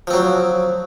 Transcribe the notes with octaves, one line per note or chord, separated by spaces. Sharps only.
F3 F#3 C4